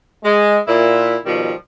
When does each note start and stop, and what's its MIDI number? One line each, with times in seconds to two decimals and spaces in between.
0.24 0.58 56
0.68 1.17 46
0.68 1.17 64
1.26 1.53 47
1.26 1.53 51
1.26 1.53 53
1.26 1.53 55